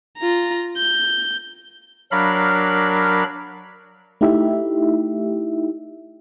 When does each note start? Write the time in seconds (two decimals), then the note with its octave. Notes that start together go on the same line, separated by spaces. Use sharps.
0.18 F4 A#5
0.77 G6
2.12 F#3 D4 A#4 F5 B5
4.21 A3 D#4 E4 G4 E5